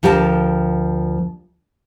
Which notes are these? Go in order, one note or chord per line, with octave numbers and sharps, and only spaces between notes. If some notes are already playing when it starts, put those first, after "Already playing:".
D2 F3 G4 A#4 E5 A5